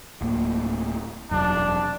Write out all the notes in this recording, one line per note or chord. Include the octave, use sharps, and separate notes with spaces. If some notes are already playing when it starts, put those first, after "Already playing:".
D1 A2 A#3
E1 C2 F#2 D4